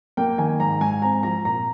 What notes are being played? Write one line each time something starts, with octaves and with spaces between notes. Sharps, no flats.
A#3 G5
D#3 G#5
G#2 A#5
G#2 G#5
C4 A#5
F3 A#5
A#2 A#5